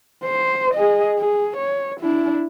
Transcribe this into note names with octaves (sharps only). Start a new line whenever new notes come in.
C5
G#4 D#5
G#4
C#5
D4 E4